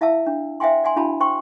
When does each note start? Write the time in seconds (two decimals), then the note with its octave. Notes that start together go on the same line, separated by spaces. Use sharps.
0.01 E4 E5 F5 A5 E6
0.27 D4
0.60 C5 E5 F5 G5 G#5 C6
0.84 D5 F#5 G#5 C6
0.96 D4 E4 F#4 F5 A5 B5
1.20 C5 G5 C6 C#6